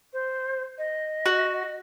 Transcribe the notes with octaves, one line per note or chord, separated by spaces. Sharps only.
C5
D#5
F#4